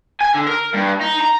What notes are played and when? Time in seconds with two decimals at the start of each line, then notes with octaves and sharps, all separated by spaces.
0.20 G#5
0.34 D3
0.46 A#4
0.75 G2
1.02 D#4
1.21 A#5